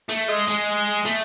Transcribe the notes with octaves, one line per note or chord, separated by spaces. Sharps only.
A3
G#3
G#3
A3